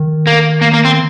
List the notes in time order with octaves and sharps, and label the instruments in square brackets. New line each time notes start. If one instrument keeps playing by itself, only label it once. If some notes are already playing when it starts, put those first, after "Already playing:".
Already playing: [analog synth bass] D#3
[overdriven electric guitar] A#3
A#3
A#3
C4